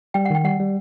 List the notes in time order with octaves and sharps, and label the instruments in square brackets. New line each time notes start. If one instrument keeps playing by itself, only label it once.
[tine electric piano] G3 [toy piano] G5
[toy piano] F#5
[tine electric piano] D#3 [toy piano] G5
[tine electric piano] G3 [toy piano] F#5
[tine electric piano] G3